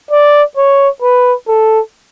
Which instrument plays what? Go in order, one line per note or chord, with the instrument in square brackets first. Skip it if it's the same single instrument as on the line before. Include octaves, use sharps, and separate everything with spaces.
[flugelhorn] D5
C#5
B4
A4